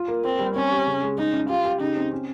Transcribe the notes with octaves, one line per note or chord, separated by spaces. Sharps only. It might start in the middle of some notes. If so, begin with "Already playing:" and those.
Already playing: F4
A#3
A#3 C4
G3
C4 C#4
G4
C#3
G#3
G#3 D#4
C#4
F4 G4
G4
C#3 D#4
C4
C#4